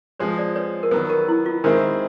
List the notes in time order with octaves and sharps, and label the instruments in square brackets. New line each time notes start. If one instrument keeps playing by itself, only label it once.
[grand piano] F3 G#3 C4 [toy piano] B4 C#5
[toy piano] C5 D5
B4 C#5
A#4
[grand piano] D#3 F#3 B3 [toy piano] B4
[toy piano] A#4
E4
F4
[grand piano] D#3 G#3 C4 E4 [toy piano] A#4